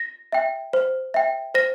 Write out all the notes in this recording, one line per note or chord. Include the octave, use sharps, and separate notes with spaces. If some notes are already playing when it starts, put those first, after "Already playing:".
Already playing: A#6
E5 G5
C5
E5 G5
C5 A#6